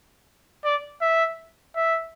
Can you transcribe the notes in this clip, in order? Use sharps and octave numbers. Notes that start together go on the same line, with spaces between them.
D5
E5
E5